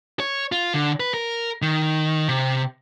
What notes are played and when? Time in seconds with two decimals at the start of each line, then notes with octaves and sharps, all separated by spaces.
0.20 C#5
0.52 F4
0.75 D3
1.00 B4
1.14 A#4
1.62 D#3
2.28 C3